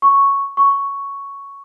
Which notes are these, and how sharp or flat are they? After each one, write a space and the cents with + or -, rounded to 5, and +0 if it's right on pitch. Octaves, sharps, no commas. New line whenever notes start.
C#6 +0
C#6 +5